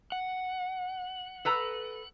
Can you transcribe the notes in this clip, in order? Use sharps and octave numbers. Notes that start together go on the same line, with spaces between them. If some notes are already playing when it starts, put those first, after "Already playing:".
F#5
A4 B4 A#5